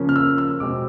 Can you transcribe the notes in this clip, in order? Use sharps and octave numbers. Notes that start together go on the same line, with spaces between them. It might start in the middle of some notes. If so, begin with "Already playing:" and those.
Already playing: C#3 F3 A#3 C#4
F6
E6
E6
B2 G#3 C4 D6